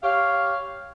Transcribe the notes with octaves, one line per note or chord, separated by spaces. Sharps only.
G4 C#5 F5